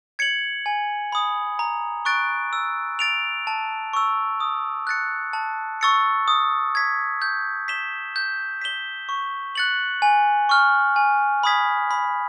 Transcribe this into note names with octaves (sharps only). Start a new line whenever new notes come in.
G#6 C#7 F#7
G#5
B5 D#6
A#5
C#6 F#6 A6 D7
E6
A6 D7 F7
A5
C#6 E6
D#6
F#6 A6 C#7
A5
C#6 E6 A6 C#7
D#6
G#6 B6
G6
B6 E7 G7
G6
B6 E7 G7
C#6
F#6 A6 C#7 F#7
G#5
C#6 F6
G#5
B5 D#6 G#6 B6
B5